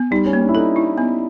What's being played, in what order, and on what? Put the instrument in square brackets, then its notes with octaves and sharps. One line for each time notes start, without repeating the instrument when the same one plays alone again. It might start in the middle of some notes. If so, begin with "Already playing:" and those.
Already playing: [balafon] B3
[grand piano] G3 [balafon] D#4
[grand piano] C#4
[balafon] A#3
[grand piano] D4
E4
[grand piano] D#4 [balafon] A4
[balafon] E4
B3